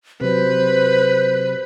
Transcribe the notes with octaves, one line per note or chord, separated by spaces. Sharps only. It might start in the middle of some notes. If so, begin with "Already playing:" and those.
C3 F#3 B4 C5